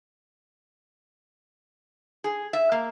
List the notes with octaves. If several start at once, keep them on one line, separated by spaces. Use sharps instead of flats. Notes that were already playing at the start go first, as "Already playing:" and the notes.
G#4
E5
A#3